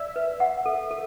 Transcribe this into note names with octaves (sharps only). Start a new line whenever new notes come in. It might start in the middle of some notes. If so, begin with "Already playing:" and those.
Already playing: D5 E5
B4
F#5
A4
A4